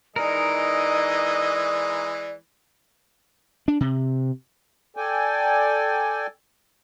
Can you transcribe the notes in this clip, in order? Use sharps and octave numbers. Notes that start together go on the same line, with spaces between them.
E3 G#3 D#4 A#4 D5 D#5
D4
C3
A4 D5 G5 G#5